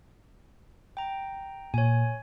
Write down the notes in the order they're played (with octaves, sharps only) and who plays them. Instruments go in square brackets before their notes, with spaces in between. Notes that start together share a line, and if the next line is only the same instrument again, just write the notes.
[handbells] G5 A#5
[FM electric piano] A#2 [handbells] C#5 G#5